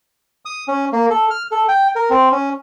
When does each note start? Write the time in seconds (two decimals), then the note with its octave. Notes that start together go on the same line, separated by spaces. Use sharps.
0.45 D#6
0.68 C#4
0.93 A#3
1.10 A4
1.30 F6
1.51 A4
1.69 G5
1.96 A#4
2.10 C4
2.32 C#4